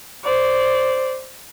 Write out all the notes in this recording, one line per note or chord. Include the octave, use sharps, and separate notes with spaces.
C5 D5